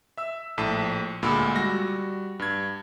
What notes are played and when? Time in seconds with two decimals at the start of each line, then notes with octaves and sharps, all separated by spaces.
0.17 E5 E6
0.58 A#1 A2 A5 B6
1.22 D2 A#2 G#3 B5 E6
1.55 G3 F#4 A#6
2.39 G2 G#6